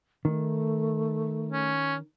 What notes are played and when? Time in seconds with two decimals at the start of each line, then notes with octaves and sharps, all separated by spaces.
0.25 D#3 A3
1.52 C#4